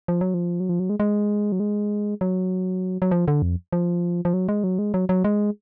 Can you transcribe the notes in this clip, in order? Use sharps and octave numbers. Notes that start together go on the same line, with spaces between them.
F3
F#3
F3
F#3
F3
F#3
G#3
G#3
F#3
G#3
F#3
F#3
F3
D3
F2
F3
F3
F#3
G#3
F#3
G#3
F#3
F#3
G#3